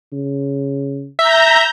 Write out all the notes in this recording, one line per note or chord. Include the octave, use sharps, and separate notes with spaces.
C#3
E5 A#5 G6 A#6